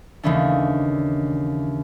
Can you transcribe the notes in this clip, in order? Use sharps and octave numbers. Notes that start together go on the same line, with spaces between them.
D#2 C#3 E3 A3 C#4 D4